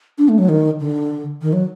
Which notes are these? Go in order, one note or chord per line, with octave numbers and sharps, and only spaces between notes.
D4
A3
F#3
D#3
D3
D#3
F#3